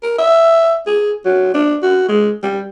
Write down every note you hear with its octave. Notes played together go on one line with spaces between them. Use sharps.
A#4
E5
G#4
F#3
D4
F#4
G#3
G3